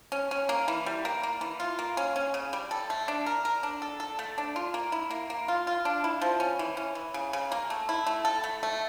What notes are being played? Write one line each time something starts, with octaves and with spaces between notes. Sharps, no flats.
C#4
C#4
A#3
E3
G3
A#3
A#3
E3
F4
A#3
C#4
C#4
C#3
G3
A4
A3
D4
A#4
A#4
D4
A4
A4
A3
D4
F4
A#3
E4
A#3
A#3
F4
F4
D4
E4
F3
C#4
E3
C#4
E3
C#3
C#3
A#3
A3
E4
A3
A4
A3
A3